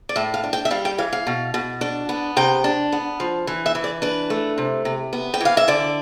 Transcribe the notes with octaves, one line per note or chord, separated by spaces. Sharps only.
D5
A2 E5
F5
D4
G5
E5
G3 F5
G5
E3 F5
F5
B2
B2
D4
B3
C3 G5
D4
B3
F3
E3
E5
E3
D5
D4 B4
A3
C3
C3
B3
G5
E3 F5
E5
D3 D5